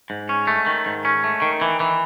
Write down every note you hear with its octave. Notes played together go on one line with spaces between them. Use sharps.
G#2
C#4
A3
D#3
G#2
C#4
A3
D#3
E3
E3